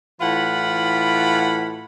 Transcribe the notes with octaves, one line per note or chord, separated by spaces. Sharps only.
A2 E3 F4 F#5 B5